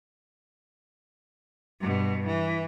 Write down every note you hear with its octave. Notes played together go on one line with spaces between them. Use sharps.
G2 B2
E3